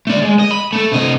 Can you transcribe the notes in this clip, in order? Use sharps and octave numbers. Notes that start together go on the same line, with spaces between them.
A3 D5
G#3
D#5
B5
A3 A4
C3 D#5